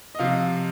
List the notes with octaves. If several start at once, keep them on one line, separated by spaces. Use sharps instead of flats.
D#5
C3 F3 F5